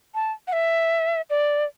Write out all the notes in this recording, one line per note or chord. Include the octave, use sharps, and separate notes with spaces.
A5
F#5
E5
D5